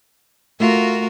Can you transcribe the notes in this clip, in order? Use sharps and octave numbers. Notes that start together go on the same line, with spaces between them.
A3 F4 F#4 A#4